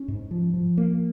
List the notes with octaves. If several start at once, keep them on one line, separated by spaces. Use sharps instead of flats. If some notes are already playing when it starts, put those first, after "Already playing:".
Already playing: C#4
G#2
F3
F3
A#3